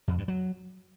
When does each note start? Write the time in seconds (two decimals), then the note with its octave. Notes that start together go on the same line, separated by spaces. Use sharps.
0.08 F2
0.18 G2
0.28 F#3